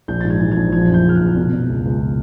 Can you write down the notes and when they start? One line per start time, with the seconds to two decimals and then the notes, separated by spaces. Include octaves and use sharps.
0.08 A#1 G6
0.21 G#2 A6
0.30 G#6
0.40 E3
0.51 G#6
0.57 A#1
0.72 F3 G#6
0.88 F#2
0.94 G6
1.04 C#3 F6
1.15 F#6
1.20 F#1
1.36 B2
1.53 B2
1.69 C#2
1.85 C#2